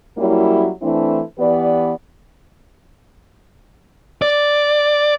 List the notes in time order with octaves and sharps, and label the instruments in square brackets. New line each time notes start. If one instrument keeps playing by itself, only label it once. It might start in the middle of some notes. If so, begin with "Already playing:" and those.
[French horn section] F#3 G3 A#3 C#4 E4
E3 A3 C4 D4 E4
E3 B3 G4 B4 D5
[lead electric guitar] D5